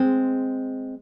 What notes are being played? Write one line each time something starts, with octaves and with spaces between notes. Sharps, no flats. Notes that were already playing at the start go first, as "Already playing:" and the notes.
Already playing: G#3 C4